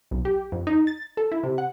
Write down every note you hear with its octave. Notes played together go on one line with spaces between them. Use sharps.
B1
G4
F2
D#4
A6
A4
E4
C3
F#5